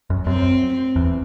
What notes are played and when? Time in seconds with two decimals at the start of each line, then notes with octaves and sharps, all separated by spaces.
0.10 F#2
0.27 F#2 C4
0.96 E2